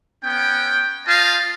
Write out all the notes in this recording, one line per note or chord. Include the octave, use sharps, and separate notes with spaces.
B3 C#4 G5
F4 C5 D#5 F5 A5